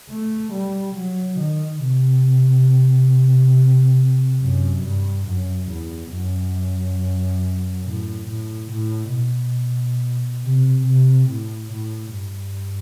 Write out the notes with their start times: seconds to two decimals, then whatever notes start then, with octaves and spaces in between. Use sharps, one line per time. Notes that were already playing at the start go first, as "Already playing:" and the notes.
0.10 A3
0.53 G3
0.96 F#3
1.40 D#3
1.83 C3
4.41 F#2
4.83 G2
5.27 F#2
5.70 E2
6.13 F#2
7.85 A2
8.28 A2
8.71 A2
9.13 B2
10.43 C3
10.86 C3
11.30 A2
11.72 A2
12.15 G2